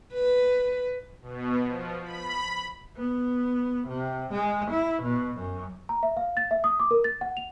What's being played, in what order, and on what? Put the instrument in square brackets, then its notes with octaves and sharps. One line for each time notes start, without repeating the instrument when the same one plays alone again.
[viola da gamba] B4
[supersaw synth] B2
F3
B5
[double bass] B3
C3
G#3
E4
B2
F#2
[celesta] A#5
E5
F5
A6
E5
D#6
D6
A#4
A6
F#5
F7